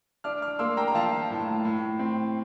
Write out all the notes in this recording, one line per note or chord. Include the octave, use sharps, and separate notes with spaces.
D4 D6 F6
D6 F6
A#3 C6 E6
G5 A#5
A#5
F3 F5 A5
A2
A2
C4